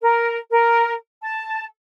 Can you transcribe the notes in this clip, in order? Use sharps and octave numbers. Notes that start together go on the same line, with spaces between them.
A#4
A#4
A5